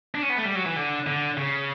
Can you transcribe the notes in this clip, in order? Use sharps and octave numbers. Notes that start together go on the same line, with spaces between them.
D4
C#4
B3
A3
G3
F#3
E3
D3
D3
C#3